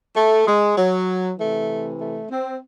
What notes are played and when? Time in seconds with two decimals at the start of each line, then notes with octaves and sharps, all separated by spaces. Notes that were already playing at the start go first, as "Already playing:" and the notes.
0.17 A3
0.48 G#3
0.78 F#3
1.39 C3 E3 A3
2.00 A3
2.31 C4